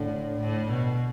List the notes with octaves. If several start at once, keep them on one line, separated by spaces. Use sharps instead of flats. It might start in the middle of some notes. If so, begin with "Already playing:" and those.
Already playing: A2 D3
A2
B2